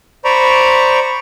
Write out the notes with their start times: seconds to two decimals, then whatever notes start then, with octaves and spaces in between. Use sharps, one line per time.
0.25 C5 D5 A#5 B5 C#6